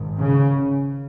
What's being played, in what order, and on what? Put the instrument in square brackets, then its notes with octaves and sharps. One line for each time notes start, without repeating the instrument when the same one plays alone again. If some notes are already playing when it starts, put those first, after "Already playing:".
Already playing: [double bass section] G#1 G#2
C#3